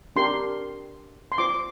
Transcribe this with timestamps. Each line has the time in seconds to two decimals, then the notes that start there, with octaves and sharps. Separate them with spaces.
0.16 D4 G4 A#4 C6
1.32 C6
1.38 F4 C5 D6